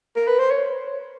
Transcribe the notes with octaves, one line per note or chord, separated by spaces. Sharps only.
A#4
B4
C5
C#5